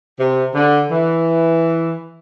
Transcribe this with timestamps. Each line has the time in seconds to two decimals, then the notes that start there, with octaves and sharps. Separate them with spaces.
0.19 C3
0.55 D3
0.91 E3